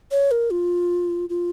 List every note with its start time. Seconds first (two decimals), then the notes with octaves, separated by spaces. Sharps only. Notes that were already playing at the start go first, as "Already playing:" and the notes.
0.11 C#5
0.31 A#4
0.51 F4
1.29 F4